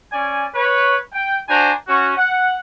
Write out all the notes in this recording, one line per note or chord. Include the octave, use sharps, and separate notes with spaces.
C#4 D5 G#5
B4 C#5
G5
D4 F#4 C5 G#5 A#5
C#4 F#4
F#5